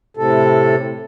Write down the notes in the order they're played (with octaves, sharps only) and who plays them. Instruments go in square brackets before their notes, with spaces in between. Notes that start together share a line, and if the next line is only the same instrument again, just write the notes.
[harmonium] A2 C3 A4